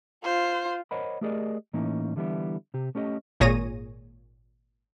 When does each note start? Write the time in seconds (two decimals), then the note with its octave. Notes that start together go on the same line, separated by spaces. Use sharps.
0.24 F4 C5
0.91 A#4 C5 C#5 D#5 F#5 B5
1.21 A3 G4 G#4 A#4 D5 D#5
1.73 A2 E3 A#3 C#4 D#4
2.16 D3 E3 G3 B3 E4
2.74 C3 G4
2.95 A3 C#4 G4 D5 D#5
3.40 G#1 A#2 G#4 C#5 A#6 D#7